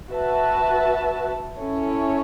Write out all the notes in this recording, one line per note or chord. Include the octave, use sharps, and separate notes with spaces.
F#4 B4 E5 A5
C#4 E4 A4 C#5